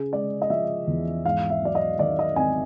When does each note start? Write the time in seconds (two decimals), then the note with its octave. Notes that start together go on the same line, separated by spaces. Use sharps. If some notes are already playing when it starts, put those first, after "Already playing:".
Already playing: C#3 G#4
0.12 G#3 D5
0.42 D#5
0.50 F3 E5
0.87 E2
1.25 G#2 F5
1.50 E5
1.62 F#3 D5
1.75 D#5
1.99 D#3 D5
2.19 D#5
2.36 G#1 G#5